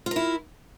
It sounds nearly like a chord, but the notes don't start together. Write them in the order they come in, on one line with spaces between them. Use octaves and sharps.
F4 A#4 E4